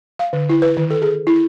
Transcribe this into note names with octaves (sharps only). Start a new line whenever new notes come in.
F5
D3
E4
B4
D#3
A4
G#4
E4